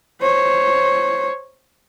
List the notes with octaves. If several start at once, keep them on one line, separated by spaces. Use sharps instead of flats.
C5 C#5